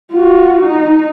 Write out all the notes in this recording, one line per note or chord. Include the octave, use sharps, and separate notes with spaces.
F4 F#4
D#4